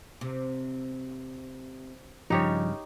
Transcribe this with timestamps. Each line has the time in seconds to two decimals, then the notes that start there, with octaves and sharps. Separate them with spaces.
0.21 C3
2.30 G2 C#3 F3 D#4 G4 C#5